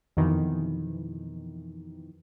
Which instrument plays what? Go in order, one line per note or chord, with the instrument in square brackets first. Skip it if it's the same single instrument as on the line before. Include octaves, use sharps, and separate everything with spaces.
[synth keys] F2 B2 D#3 E3